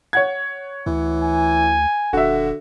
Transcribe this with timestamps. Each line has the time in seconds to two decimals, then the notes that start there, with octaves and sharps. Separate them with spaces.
0.13 C#5 F#5 G#6
0.86 D2 E3
1.22 G#5
2.13 D#1 D3 F#4 E5